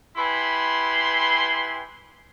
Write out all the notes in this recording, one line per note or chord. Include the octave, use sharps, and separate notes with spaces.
E4 G4 B4 G#5 B5 C6